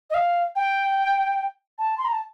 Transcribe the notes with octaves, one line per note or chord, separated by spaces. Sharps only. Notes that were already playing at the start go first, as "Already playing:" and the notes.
D#5
F5
G5
A5
C6
A#5
A5